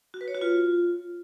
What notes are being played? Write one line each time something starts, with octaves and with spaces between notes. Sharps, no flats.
F#4
B4
C#5
F#4
F4